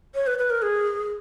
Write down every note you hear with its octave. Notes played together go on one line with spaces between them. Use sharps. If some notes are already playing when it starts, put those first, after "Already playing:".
C#5
B4
B4
A#4
G#4